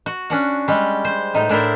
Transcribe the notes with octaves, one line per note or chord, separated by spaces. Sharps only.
F#4
C#4 D4 F#5
G3 G#3
C5
A2 D#4
A2 D4 E4 A#4 C5